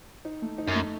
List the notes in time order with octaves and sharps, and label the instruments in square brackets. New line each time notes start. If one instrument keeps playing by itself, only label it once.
[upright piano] D#4
A3
D#4
[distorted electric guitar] F#2
[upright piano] A3